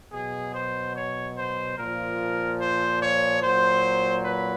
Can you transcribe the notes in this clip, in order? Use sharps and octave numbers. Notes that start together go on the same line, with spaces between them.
B2 F#3 G#4
C5
C#5
C5
A#2 F3 A#4
C5
C#5
A#2 F#3 C5
B4